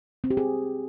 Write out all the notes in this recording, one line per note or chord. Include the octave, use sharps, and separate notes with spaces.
C4
G4
G#4